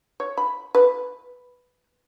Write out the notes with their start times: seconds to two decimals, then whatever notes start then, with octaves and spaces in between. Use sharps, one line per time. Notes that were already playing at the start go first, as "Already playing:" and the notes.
0.20 C#5
0.37 B5
0.75 B4